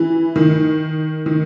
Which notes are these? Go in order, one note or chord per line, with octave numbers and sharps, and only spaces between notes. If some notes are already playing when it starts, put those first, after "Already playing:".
Already playing: E3
D#3
D#3